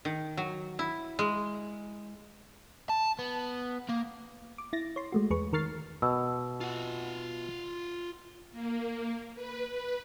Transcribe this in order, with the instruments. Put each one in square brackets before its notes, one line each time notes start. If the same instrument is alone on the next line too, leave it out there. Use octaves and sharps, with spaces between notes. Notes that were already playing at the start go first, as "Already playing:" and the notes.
[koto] D#3
F#3
E4
G#3
[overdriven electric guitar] A5
B3
A#3
[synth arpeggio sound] D6
E4 A6 A#6
C#5 C6
G#3 A3 F#4
E2 G#4 B4 C#6
D#3 A#4 C#6 F6 A6 C7
[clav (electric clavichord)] B2 [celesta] E6
[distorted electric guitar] F4 F#5
[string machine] A#3
B4
B4